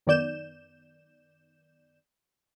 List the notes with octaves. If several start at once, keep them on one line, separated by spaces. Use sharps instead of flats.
F#2 D#3 B3 D5 G6 E7